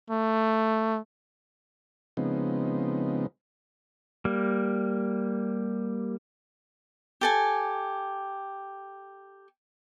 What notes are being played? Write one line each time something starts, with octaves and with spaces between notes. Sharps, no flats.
A3
C#3 F3 G#3 B3 C4 D#4
G3 A#3
G4 A4 G#5